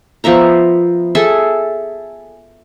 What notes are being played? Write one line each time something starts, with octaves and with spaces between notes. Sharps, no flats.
F3 B3 E5 A#5
G#4 A4 E5